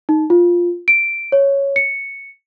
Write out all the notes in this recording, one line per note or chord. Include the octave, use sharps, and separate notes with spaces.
D#4
F4
D7
C#5
C#7